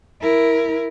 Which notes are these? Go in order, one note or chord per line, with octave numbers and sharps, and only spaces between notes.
E4 A#4